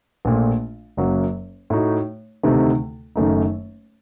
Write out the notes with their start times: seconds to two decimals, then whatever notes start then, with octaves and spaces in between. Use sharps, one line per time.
0.25 A#1 A#2 A3
0.97 F#1 F#2 F#3 A#3
1.70 A2 A3 D#4 F#4
2.43 D2 C3 D#3 A3 D#4
3.16 F#1 F#2 D#3 A3 D#4